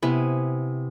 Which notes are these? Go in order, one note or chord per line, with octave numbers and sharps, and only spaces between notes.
C3 B3 E4 G#5